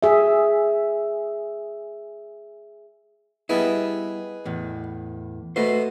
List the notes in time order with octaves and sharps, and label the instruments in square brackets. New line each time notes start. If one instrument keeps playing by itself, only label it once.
[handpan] G#4 E5
[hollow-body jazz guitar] G3 B3 E4 [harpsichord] G#4 B4 D#5
[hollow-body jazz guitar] E2 A2
[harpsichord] B2 A3 [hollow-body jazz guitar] F#4 B4 C5